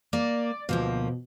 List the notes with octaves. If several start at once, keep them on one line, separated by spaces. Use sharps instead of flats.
A#3 D5
D2 B2 F3 A#3